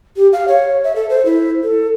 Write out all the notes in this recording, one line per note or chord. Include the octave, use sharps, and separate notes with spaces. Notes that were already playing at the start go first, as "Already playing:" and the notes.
G4
F5
C#5
E5
A4
C5
E4
A4